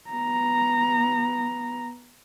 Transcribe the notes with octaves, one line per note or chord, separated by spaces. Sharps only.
B3 A#5